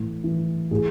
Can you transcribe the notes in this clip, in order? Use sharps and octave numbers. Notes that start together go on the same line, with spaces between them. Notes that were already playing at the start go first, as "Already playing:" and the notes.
Already playing: A2 E3
E3
A2 G#4